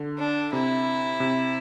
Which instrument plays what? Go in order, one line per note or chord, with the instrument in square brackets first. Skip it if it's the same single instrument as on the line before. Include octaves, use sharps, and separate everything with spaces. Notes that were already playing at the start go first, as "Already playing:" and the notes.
Already playing: [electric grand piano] D3
[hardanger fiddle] D4
[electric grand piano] C3 [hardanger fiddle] E4
[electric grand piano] C3